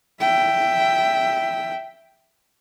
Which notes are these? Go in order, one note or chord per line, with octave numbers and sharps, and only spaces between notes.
E5 G5